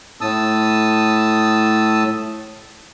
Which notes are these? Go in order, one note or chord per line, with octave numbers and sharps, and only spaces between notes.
A2 A5 D#6 E6